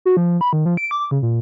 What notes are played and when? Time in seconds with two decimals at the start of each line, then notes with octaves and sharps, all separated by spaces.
0.05 F#4
0.17 F3
0.41 B5
0.53 D#3
0.66 F3
0.77 D7
0.91 D6
1.11 C#3
1.22 A#2